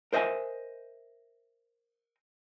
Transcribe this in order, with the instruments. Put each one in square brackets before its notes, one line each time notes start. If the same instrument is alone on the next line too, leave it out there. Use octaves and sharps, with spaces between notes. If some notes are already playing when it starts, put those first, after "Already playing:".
[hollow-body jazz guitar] A#4 C5 D#5 E5 G#5